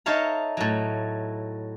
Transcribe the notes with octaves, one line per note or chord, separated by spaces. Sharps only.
D#4 A4 C#5 E5 F5 A#5
A2 F#3